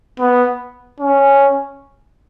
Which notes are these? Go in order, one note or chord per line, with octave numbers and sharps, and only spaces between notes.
B3
C#4